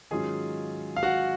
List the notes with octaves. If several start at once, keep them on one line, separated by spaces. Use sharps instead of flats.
G#2 D#3 F#3 C#4 F4 G#4 G#5
F5
F#4 F#5